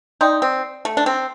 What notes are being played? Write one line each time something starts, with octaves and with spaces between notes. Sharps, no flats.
D#4 D5 G5 C6 D#6 G6
C4
A3
D4
C4